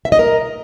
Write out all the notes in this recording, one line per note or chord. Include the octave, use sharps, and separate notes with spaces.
E5
D#5
A#4